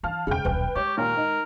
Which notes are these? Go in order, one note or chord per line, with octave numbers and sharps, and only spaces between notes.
E3 F5 A5 F6
E1 C#3 G#3 G5
D#1 B1 B4 G5
G#3 G4 C#5
D#2 A#2 A#4
D#4